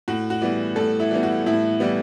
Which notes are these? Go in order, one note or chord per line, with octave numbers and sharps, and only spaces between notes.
A2 F#4
F#4
E3 G3 B3
A2 A4
E4
E3 G3 B3
F#4
A2 E4
E3 G3 B3